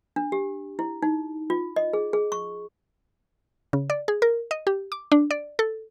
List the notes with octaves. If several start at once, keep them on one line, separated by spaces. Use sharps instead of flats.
D4
G4
E4
D#4
F4
D#5
G#4
G#4
C#6
C#3
D5
G#4
A#4
D#5
G4
D6
D4
D5
A4